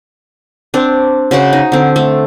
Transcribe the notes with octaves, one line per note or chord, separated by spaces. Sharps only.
C4 D4
C#3 F#4 C5 F#5
D#4
D3 C4
A3